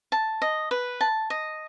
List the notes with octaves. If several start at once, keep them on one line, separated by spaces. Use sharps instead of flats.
A5
D#5
B4
A5
D#5